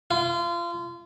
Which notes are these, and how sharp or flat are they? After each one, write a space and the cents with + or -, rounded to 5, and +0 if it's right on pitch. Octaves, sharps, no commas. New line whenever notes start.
F4 -30